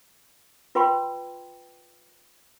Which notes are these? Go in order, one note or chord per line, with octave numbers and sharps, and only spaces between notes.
F4 B4 G5 B5 C6